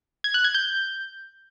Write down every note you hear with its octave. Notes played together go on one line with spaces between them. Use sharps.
G#6
F#6
G#6
G6